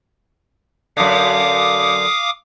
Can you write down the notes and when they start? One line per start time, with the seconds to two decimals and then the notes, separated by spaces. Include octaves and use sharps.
0.97 F#2 D3 F5 D6 D#6